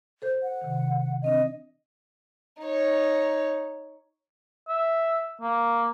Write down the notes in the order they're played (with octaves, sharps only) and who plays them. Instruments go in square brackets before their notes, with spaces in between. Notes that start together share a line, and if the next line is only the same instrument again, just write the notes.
[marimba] A4 C5 G6
[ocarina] F#5
[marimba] C3 D#3
[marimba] E3 C4 D4 [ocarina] D#5
[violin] D#4 C#5
[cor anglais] E5
A#3